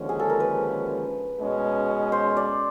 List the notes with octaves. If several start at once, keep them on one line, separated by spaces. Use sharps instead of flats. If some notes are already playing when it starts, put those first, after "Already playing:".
Already playing: D#2 D3 F3 G#3 C#4
G#4
A4
A#4
B4
B2 G#3 C#4
C5
D5